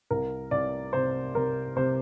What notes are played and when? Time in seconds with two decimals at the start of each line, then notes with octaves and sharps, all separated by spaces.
0.10 C2 A#4
0.51 C2 D5
0.93 C3 C5
1.35 C3 A#4
1.76 C3 C5